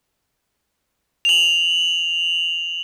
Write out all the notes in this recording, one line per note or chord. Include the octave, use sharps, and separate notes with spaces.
F7 F#7